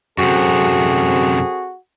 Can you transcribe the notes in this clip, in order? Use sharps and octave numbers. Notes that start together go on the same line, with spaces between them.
F#2 C3 C4 F#4 G#4 A4